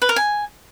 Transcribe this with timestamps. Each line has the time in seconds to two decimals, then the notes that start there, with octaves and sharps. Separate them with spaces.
0.02 B4
0.09 A#4
0.16 G#5